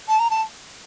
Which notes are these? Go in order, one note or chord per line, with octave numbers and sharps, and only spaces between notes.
A5
A#5
A5